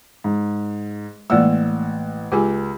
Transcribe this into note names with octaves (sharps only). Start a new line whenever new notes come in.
G#2
A1 G#3 A#3 D5 F#5 E6
C#2 G4 G#4 G#5